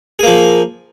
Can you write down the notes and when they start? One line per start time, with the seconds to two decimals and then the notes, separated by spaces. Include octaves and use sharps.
0.19 G#4
0.23 A#3
0.27 F3